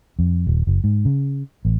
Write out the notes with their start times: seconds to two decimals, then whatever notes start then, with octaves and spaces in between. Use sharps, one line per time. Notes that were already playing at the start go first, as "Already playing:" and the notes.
0.19 F2
0.47 D#1
0.67 F#1
0.84 G#2
1.05 C#3
1.65 A1